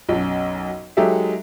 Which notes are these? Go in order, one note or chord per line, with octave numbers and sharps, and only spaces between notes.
B1 F#2
F#3 G#3 D#4 G4 A4 E5